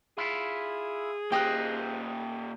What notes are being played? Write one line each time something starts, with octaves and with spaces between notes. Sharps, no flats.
E4 F4 G#4
A#2 G4 C5 D#5 G5 D#6 F#6